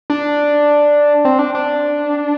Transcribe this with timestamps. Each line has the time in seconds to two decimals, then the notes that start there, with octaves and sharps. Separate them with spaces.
0.10 D4
1.25 C4
1.39 D4
1.55 D4